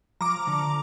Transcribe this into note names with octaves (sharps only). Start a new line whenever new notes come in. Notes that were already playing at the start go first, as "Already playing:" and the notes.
F3 A#5 D6
D3